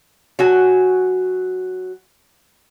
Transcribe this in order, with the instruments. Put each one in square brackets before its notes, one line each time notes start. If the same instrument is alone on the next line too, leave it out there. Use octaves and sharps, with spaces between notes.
[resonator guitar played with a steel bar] F#3 F#4 G#5